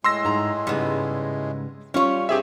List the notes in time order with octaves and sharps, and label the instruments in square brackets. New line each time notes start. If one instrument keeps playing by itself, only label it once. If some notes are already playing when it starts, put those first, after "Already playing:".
[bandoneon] A2 G#3 [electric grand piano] C6 E6 A#6
[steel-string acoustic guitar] G#2 A#5
[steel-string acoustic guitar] G#2 C#3 [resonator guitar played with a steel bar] G3 B3
[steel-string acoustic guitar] G3 F4 [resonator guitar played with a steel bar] C#4 C#5
[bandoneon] G2 C4 [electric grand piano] G4 G#4 E5